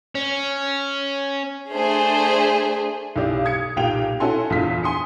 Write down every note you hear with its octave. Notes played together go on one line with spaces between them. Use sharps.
C#4
A3 D4 G#4 C5
B1 E4 G4 D5
D#6 G#6 C#7
B1 A#2 G4 F5 G5 F7
C#4 E4 F#4 A4 G#5 C6
A#1 E2 F4 B6
G#5 C6 D#6 C#7